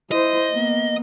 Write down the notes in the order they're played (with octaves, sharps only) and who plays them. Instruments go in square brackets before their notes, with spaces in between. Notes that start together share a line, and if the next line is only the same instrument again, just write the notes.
[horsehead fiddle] E4 C5 [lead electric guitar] D#5
[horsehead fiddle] A#3 B3